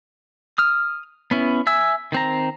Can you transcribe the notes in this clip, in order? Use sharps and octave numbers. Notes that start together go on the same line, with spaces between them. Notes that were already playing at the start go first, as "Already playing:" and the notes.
D#6 F6
B3 C#4 E4
E5 G#5 E6
D#3 C4 A#5